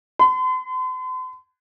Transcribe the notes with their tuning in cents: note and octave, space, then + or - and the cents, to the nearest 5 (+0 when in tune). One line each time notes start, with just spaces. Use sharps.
C6 -45